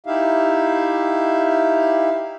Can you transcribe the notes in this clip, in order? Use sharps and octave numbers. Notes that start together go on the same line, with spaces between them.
D#4 E4 G4 E5 F5